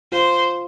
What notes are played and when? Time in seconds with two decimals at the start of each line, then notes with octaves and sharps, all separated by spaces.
0.12 F4 C5